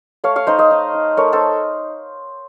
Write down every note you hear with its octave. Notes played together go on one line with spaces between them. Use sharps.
A3 C#5 F5
C#5 F5
D#4 C5 D#5
C5 D#5
D#4
D#4
A3 A#4 C#5
A4 C5